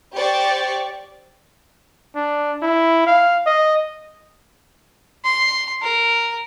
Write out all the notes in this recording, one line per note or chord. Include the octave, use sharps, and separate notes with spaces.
G4 C5 D5 C#6
D4
E4
F5
D#5
C6
A#4